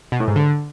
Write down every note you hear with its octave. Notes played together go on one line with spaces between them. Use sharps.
B2
A2
G#2
D3